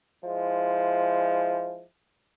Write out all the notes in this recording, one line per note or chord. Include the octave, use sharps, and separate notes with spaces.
F3 G#3 E4